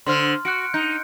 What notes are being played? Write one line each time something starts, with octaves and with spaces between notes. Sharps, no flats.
D3 C5 C6 F6
F#4 F#6 C#7 D7
D#4 G6